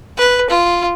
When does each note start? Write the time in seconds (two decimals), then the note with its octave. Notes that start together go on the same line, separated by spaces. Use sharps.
0.17 B4
0.49 F4